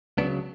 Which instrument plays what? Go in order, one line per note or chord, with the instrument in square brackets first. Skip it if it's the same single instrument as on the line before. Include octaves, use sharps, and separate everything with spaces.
[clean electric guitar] C#2 C#3 F#3 B3 D4